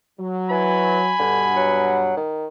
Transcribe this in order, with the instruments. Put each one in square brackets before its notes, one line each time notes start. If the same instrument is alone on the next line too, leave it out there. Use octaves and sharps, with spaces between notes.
[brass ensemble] F#3
[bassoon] E3 [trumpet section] G#5 B5
[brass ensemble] G2 B2 F#5 [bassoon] D3
[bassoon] F#3
D#3